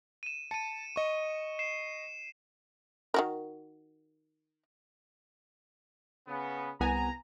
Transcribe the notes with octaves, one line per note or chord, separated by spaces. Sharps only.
D#7 E7
A5 C#7 D#7
D#5 C#6
C7 E7
D#3 F#4 A#4
C#3 B3
C2 B3 G#5 A#5